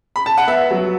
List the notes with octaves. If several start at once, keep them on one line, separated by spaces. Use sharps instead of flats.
B5
A5
F#5
B3 E5
F#3